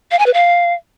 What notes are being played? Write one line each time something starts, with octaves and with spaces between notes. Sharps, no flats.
F5
G#5
B4
F5